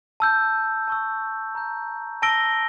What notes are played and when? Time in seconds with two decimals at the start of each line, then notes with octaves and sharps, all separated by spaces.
0.20 A5 E6 G6
0.88 A5 C#6 E6
1.55 A#5 E6 G6
2.22 A5 E6 A#6 D7 G7